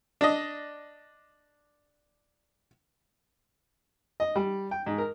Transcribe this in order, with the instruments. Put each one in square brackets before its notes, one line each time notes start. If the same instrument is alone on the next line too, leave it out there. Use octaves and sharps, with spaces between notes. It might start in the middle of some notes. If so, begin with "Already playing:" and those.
[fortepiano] D4 D#5
D#5
G3
G5
G#2
A#4